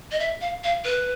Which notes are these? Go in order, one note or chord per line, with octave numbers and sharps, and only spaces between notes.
D#5
E5
F5
F5
B4